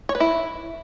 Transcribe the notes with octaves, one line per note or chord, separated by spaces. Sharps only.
C#5
B4
E4